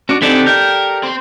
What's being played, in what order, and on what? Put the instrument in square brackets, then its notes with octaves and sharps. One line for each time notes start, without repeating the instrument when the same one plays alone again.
[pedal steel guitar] C#4 D4 D5 [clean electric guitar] F#4
[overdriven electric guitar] D3 [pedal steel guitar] C4 D#4 G#5 [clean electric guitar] G4 A4 D5
[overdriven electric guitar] A#4 [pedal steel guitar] G5 G6
[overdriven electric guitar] C4 C6